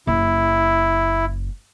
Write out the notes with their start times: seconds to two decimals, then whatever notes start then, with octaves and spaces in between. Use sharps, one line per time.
0.07 F#1 E4